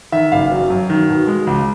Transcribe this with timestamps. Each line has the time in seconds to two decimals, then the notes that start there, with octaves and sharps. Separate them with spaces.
0.12 D#3 E5
0.32 F#1 F5
0.51 F#3
0.70 F#2
0.90 D#3
1.09 B2
1.27 G#3
1.47 C#2